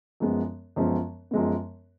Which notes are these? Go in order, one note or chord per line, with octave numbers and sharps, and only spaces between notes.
F#2 F3 G#3 B3
F#2 F3 G#3 B3
F#2 F3 G#3 B3